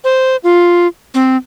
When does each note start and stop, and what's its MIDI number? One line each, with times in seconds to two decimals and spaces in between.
0.04 0.36 72
0.44 0.87 65
1.14 1.37 60